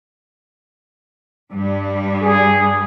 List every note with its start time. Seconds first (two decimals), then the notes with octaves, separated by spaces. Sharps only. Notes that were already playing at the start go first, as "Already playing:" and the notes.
1.51 G2 G3
2.21 G#4